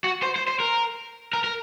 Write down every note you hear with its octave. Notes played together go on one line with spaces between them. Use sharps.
F#4
C5
C5
C5
A#4
A#4
A#4